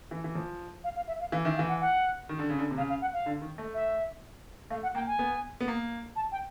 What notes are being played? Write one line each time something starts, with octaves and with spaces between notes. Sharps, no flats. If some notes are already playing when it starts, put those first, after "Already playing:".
E3
E3
F3
F5
F5
E5
F5
E3 F5
D#3 E5
F5
E3
F#5
F#5
D#3
D3
C#3
D3
C3
C#3 F5
F5
F#5
F5
D3
D#3
A3
E5
A3 F5
F#5
A#3 G5
G#5
B3
B3
A#3
A5
G5